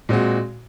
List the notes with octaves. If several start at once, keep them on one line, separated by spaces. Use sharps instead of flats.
A#2 G#3 C4 F#4